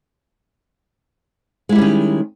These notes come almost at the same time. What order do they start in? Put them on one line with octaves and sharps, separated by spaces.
G#3 E4 G3 C#4 D#3